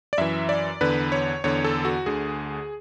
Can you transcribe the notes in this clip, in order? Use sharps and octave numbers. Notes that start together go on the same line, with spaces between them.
D5
F#2 E3 E5
D5
E2 D3 B4
C#5
E2 D3 C#5
A4
F#4
D2 D3 G#4